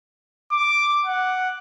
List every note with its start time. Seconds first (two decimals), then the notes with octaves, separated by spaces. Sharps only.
0.52 D6
1.05 F#5